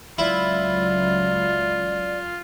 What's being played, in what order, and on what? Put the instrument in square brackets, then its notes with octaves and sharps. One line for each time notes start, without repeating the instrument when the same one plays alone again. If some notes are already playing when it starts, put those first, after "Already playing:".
[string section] C#2 F#3 [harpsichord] E4 [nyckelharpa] F4 [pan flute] D5